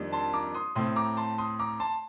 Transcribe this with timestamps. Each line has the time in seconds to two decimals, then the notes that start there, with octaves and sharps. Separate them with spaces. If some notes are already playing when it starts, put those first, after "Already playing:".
Already playing: F2 D#3 G3 A#3 D4
0.12 A5 C6
0.33 A#5 D6
0.55 C6 D#6
0.75 A2 A3 C4 C6 D#6
0.96 A#5 D6
1.17 A5 C6
1.38 C6 D#6
1.59 A#5 D6
1.80 A5 C6